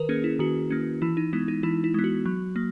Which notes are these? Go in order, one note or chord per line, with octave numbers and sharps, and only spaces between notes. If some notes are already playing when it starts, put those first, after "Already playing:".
Already playing: D#3 A#4 B4
A#3 C#4 G#4
E4
D#3 F#4
A#3 C#4
E3 E4
D#4
G#3 B3 E4
D#4
E3 E4
E4
G#3 B3
F#4
F#3
A#3